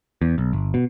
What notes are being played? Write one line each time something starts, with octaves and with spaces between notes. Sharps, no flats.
E2
B1
G1
B2